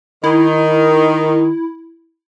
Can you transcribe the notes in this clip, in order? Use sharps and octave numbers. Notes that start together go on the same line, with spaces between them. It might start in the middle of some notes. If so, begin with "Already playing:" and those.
D#3 E4